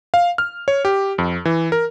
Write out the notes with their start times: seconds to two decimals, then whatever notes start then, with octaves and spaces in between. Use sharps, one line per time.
0.14 F5
0.38 F6
0.68 C#5
0.85 G4
1.18 F2
1.45 E3
1.72 A#4